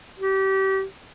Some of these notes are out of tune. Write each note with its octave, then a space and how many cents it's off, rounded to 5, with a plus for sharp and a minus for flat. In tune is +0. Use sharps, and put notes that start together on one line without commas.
G4 -30